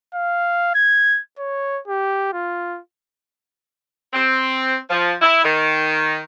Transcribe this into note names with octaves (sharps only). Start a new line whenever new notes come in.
F5
G#6
C#5
G4
F4
C4
F3
E4
D#3